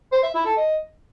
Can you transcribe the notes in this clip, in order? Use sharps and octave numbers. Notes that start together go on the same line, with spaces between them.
C5
E5
E4
A4
D#5